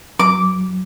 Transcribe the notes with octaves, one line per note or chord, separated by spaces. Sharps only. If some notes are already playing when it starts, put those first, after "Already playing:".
F#3 D6